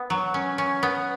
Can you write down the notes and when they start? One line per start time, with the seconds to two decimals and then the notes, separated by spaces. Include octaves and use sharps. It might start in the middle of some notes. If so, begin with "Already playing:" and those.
Already playing: B3
0.10 F#3
0.34 C#4
0.58 C#4
0.83 B3